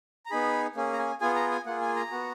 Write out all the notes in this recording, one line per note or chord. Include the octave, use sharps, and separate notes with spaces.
A#5
B3 D#4 G#4 B5
A#3 C#4 G#4
A#5
G#5
B3 F4 G#4 G#5
A#5
G#5
A#3 F4 G#4 F#5
G#5
A#5
B3 F#4